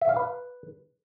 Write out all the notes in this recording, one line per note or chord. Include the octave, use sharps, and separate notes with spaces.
E5
F5
B4